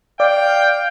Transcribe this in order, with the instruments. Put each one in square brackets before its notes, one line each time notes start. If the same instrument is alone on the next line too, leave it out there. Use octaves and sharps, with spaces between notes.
[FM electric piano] D5 [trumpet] F5 [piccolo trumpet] G5